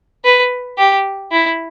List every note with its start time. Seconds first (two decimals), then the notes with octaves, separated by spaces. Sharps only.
0.25 B4
0.78 G4
1.32 E4